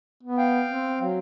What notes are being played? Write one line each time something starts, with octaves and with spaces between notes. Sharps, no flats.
B3
F5 G5
C4
F#3